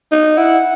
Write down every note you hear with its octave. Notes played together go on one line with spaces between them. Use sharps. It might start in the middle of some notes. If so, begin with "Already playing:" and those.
D#4
E4 F#5